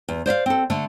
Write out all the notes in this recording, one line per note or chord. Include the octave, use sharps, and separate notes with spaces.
E2
C5 D5 E5 F5
C4 A4
D3 A3